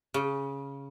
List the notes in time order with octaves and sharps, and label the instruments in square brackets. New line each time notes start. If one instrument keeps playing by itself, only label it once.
[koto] C#3